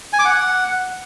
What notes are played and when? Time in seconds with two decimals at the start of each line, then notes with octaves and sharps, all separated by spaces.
0.13 G#5
0.19 D6
0.25 F#5